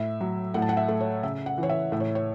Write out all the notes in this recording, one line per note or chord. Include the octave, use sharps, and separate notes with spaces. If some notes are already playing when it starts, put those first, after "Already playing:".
Already playing: A2 E5
F#3
A2 F#5
A5
F#5
E5
A3
C#5
C#3 E5
F#5
E3 C#5
E5
A2 E5
C#5
C#5